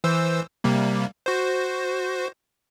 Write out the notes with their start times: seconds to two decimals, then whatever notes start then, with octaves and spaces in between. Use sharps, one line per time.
0.04 E3 C5 E6
0.64 C3 G3 A#3
1.26 F#4 C5